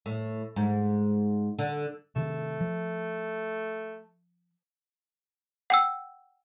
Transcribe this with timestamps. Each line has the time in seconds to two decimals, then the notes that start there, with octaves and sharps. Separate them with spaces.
0.06 A2
0.56 G#2
1.59 D3
2.16 C3 D#3 A3
2.61 F3
5.70 F#5 G5 E6